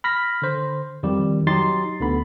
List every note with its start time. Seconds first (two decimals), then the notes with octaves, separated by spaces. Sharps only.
0.04 B5 F6 A#6 B6
0.42 D3 C5
1.03 F2 D#3 G3 G4
1.47 F#3 D#4 G4 C6 A6 C7
2.00 D2 D3 B3 B5